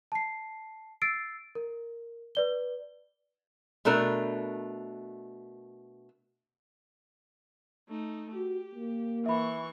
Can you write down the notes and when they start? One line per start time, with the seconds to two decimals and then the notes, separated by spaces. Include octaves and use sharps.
0.12 A5 C7
1.02 E6 A6 C7 D7
1.55 A#4
2.35 B4 D5 G7
3.85 B2 A3 D4 A#4
7.89 A3 D#4
8.35 F#4 G4
8.75 A#3
9.26 E3 E5 B5 C#6